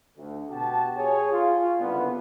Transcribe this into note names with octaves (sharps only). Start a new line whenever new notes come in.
D2
B2 F#4 G4 A5
G#4 C#5 G#5
F4
F#1 C2 D3 B3